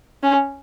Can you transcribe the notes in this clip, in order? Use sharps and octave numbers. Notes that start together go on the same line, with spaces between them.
C#4